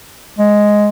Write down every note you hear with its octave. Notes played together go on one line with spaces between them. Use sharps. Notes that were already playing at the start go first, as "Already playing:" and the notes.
G#3